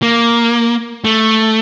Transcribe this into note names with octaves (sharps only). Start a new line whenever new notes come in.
A#3
A3